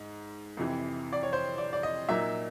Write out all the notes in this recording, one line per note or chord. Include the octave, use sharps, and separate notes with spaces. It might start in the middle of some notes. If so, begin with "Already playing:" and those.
Already playing: G#2
F2 C3 E3
D5
C#5
C5
D5
D5
D#5
A#2 F#3 A#3 D#4 E5